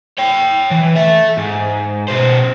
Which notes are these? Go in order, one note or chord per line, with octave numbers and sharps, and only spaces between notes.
C#5 G5
E3
A4 E5
G#2
B2 C5